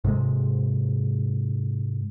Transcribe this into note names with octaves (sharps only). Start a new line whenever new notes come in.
G#2 C3 G#3